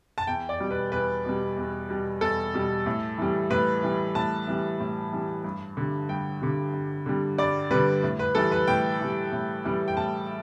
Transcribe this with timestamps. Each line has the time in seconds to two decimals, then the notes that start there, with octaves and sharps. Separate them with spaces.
0.18 A5
0.27 E2 G5
0.49 D5
0.60 B2 G3
0.71 B4
0.92 E2 B4
1.25 B2 G3
1.57 E2
1.89 B2 G3
2.21 E2 A4
2.54 B2 G3
2.86 A2
3.18 E3 G3
3.50 A2 B4
3.82 E3 G3
4.15 A2 A5
4.47 E3 G3
4.80 A2
5.12 E3 G3
5.44 G2
5.77 D3 G3
6.09 G2 G5
6.41 D3 G3
6.74 G2
7.06 D3 G3
7.38 G2 D5
7.71 D3 G3 B4
8.03 A2
8.19 B4
8.35 E3 G3 A4
8.52 B4
8.67 A2 G5
9.00 E3 G3
9.32 A2
9.65 E3 G3
9.88 G5
9.97 A2 A5